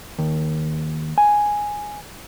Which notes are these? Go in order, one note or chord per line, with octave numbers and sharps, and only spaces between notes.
D#2
G#5